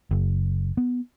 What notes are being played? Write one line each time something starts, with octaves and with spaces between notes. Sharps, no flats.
F#1
B3